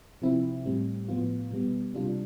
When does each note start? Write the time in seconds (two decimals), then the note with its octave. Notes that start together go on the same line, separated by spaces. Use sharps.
0.22 C3 F3 C4 E4
0.65 A2 G3 C4
1.08 A2 F3 B3 F4
1.51 B2 G3 B3
1.93 C3 G3 D4 F4